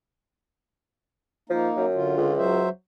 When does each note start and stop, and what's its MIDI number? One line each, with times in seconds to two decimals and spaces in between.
1.50 1.69 53
1.50 1.86 58
1.50 1.86 63
1.76 2.16 42
1.95 2.33 50
1.95 2.33 65
2.17 2.65 37
2.37 2.69 54
2.37 2.69 72
2.37 2.69 76